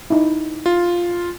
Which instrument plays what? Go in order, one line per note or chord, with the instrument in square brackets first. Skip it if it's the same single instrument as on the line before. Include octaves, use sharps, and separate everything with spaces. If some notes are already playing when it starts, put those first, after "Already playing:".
[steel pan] D#4 E4
[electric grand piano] F4